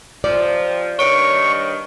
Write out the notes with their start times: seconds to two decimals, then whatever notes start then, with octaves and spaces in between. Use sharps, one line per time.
0.24 C3 F3 D5
0.99 G2 D#3 C#5 C#6 D7